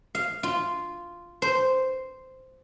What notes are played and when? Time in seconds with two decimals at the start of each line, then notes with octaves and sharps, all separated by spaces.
0.15 F5
0.43 F4
1.42 C5